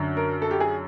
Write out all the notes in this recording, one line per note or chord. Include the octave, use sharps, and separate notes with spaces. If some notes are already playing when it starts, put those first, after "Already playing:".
Already playing: F#2 D3 F#3
A#4
A4
G4
G#4